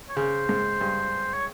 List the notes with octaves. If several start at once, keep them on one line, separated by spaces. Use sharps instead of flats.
C#5
C#3 C5
G#2
G2
C#5